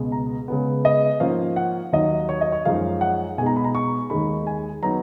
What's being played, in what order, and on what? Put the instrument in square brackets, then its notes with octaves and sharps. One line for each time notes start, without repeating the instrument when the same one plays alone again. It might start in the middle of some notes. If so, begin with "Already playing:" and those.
Already playing: [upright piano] C#2 B2 G#3
A#5
C#3 G#3 B3
D#5
G#2 F3 A#3 C#4 F5
F#5
D#2 D#3 F#3 D#5
C#5
D#5
C#5
F#2 F3 G#3 D#4 F5
F#5
B2 G#3 D#4 G#5
A#5
B5
A#5
C#6
D#2 D#3 G#3 D#4 B5
G#5
F#3 B3 D#4 A#5